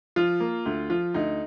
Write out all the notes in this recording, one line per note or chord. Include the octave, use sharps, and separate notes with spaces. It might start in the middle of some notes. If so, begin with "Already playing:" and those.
F3 F4
A#3
D2
F3 F4
D2 D#4